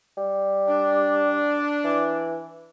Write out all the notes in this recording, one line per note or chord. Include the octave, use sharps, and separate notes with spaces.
G3
D4
E3